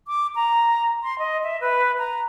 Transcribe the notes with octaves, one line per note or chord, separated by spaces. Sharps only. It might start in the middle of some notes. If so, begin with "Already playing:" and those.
D6
A#5
C6
D#5
E5
B4
A#5